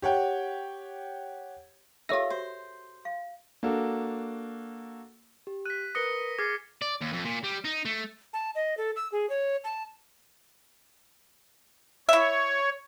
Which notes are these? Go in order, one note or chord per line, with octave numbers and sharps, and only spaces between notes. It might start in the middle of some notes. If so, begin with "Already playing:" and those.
G4 C#5 F#5 G5
D#4 F4 G4 A4 A#4 C#5 E5 A#6
F#4 C5
F5
A#3 D4 F#4 A4
G4
F#6 B6 D#7
A#4 B4 D#6 A#6 C#7 G7
G#4 D6 F6 G#6 A6 C7
D5
D#2
F2
A#2
G3
D#4
A3
A5
D#5
A4
E6
G#4
C#5
A5
E4 C#5 E5